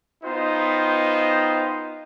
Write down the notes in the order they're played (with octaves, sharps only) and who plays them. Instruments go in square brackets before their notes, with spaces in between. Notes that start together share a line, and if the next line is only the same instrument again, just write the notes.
[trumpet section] B3 D#4 F4 C5 D#5 G5